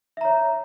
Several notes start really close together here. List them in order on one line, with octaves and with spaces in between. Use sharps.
E5 A#5 C#5